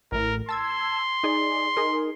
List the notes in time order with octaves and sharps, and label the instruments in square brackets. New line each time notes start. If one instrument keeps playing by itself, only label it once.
[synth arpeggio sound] A1 A2 [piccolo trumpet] A#4
[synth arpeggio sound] A5 E6 G#6 [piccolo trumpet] C6
[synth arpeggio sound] D#4 G#4 D5
D#4 G#4 A#4